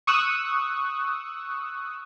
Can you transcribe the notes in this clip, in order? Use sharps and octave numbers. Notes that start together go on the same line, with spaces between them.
C#6 D#6 E6 F#6